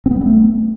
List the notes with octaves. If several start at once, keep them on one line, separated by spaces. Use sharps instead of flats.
C4
B3
G3
C4
A3